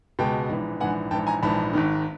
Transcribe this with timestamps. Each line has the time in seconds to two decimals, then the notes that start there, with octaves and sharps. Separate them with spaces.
0.19 C#2 B2 G#3 G5 A5
0.49 A#1 G#2 E3
0.80 A#1 G#2 E3 F#5 G#5
1.11 A#1 G#2 E3 G5 A5
1.27 G#5 A#5
1.43 A#1 G#2 E3 A5 B5
1.73 G#1 G#2 D#3